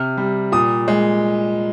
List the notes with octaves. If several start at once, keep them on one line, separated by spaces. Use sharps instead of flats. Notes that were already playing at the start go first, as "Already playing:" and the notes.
Already playing: C3 F6
G3
A#2 D#6
G#3